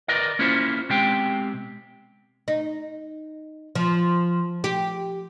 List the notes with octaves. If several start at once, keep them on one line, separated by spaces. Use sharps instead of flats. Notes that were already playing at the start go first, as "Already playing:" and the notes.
A#4 B4 D5 D#5
A#3 C#4 E4 F4 C5
B2 G#3 C4 G4 G5
D#4
F3
G4